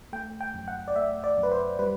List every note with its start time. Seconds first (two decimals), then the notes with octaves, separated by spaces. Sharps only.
0.13 A3 G5
0.41 G5
0.54 F#2
0.68 F#5
0.88 D5
0.96 A3 E5
1.24 D5
1.37 F#2
1.43 B4
1.52 C5
1.79 G3 B4